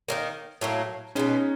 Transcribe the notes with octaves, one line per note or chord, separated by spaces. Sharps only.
D#3 G3 A#3
A2 F#3 A#3
B2 G#3 B3 C#4 D#4